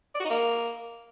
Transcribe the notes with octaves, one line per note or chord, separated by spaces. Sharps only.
D5
F#4
D#4
A#3